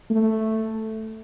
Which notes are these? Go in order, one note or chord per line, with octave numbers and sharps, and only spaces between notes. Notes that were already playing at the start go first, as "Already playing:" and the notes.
A3